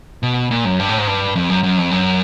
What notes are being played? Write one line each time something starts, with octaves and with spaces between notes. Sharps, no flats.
B2
A#2
F#2
G2
A2
G#2
G2
F2
F#2
F#2
F2
F#2